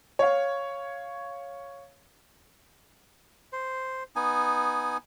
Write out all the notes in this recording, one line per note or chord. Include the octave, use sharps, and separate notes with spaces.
C#5 F5
C5
B3 D#4 G#5